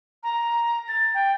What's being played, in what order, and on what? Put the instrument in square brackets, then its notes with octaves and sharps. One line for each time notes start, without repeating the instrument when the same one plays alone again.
[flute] A#5
A6
G5